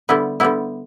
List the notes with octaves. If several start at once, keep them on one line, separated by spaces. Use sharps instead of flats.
D3 G3 B3 E4
D3 G3 B3 E4